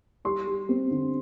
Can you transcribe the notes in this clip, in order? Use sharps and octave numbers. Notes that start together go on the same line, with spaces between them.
G3 C6
G3
C4
D3